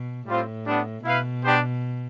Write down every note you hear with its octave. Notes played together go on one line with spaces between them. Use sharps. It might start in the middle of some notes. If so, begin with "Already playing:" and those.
Already playing: B2
A2 G3 C4 F4 C5
G3 B3 D4
B2 E4 B4 F5
B3 D4 G4 C5 G5